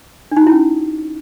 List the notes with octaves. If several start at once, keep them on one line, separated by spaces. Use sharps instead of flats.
D4
D#4
F#4
E4
C#4